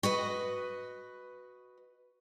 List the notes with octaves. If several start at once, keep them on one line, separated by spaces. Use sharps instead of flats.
F#4 B4 D#5